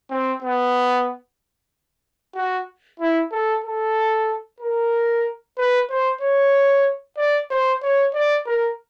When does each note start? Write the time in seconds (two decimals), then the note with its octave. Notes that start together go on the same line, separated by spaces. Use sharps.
0.10 C4
0.43 B3
2.35 F#4
3.00 E4
3.32 A4
3.64 A4
4.61 A#4
5.57 B4
5.90 C5
6.21 C#5
7.17 D5
7.50 C5
7.82 C#5
8.14 D5
8.46 A#4